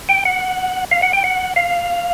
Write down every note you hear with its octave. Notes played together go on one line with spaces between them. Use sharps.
G5
F#5
F5
F#5
G5
F#5
F5